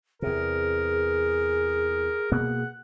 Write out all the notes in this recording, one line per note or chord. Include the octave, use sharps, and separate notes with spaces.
E2 C3 G#4 A#4
B2 A#3 B3 F#5